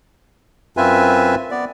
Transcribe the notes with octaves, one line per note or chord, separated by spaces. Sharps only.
F#2 C4 F4 B4 E5 G#5
B3 D5